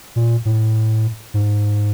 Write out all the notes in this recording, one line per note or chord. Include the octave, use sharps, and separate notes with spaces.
A#2
A2
G#2